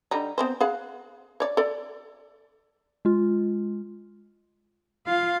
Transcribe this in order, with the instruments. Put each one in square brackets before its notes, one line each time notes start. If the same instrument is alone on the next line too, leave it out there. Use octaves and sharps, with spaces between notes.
[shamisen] D3 G3 D#4
B3 C4 C5
G#4 F5 F#5
C#5 D5
A4 D5
[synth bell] G#3 F4
[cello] F4 [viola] F5